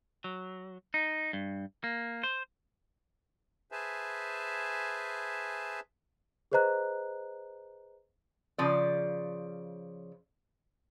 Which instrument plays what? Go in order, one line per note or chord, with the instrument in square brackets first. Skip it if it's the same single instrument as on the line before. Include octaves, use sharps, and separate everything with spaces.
[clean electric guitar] F#3
D#4
G2
A#3
C5
[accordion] G#4 B4 C5 E5 G#5 A5
[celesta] G#4 B4 C5 D#5 A#5 F#6
[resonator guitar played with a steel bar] C#3 F3 D5